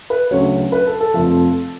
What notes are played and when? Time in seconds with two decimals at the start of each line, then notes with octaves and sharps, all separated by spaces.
0.10 B4
0.31 D2 C#3 F#3 C#5
0.72 B4
0.87 A4
1.00 A4
1.14 F1 F2 F3